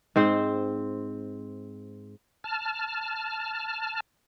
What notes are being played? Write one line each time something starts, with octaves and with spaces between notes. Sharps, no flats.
G#2 C4 C5
A5 F6